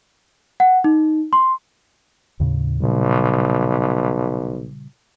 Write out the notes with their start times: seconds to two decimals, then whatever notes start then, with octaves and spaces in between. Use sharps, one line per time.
0.60 F#5
0.84 D#4
1.33 C6
2.40 D#2 A2 C#3
2.81 B1 A#2 C#3 G3